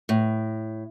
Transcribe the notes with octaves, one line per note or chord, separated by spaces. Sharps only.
A2